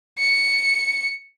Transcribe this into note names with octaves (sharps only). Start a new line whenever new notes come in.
C#7